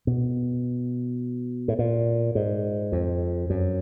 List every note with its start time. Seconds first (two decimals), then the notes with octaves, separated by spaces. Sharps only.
0.07 B2
1.68 A2
1.79 A#2
2.35 G#2
2.92 F2
3.50 F#2